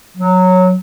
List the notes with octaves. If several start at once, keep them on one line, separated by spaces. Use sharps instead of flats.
F#3